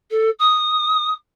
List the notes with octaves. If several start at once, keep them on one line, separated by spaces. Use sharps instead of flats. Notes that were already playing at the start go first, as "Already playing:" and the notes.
A4
D#6